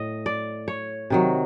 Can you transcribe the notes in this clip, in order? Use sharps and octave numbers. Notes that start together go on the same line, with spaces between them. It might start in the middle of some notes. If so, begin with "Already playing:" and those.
Already playing: A2 D#5
D5
C#5
C3 D#3 F#3